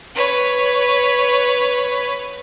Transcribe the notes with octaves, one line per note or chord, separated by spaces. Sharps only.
B4 C#5